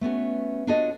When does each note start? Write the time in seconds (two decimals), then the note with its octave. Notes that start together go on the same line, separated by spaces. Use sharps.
0.01 A3 B3 C#4 F#4
0.67 D4 F4 F#4 A4 C#5 D#5